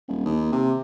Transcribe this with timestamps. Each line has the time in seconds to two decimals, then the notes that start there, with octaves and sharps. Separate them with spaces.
0.08 D#1
0.25 D#2
0.52 C3